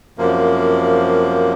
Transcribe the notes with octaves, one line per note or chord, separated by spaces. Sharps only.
F#2 C3 F3 A#3